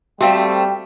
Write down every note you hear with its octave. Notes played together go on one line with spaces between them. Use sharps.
G3 A3 C4 F#4 E5 F5 G5